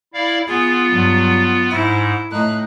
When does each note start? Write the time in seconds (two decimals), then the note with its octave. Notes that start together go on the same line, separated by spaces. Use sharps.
0.14 E4 D5 F5
0.48 B3 F4 G#4
0.89 G2 F#3
1.70 G#2 E4
2.31 A2 D#4 F#6